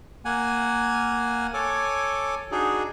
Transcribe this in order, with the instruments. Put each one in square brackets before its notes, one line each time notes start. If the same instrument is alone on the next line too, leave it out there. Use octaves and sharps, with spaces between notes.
[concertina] A#3 F#5 G#5
A4 C#5 G#5 D6
D4 D#4 F#4 G#4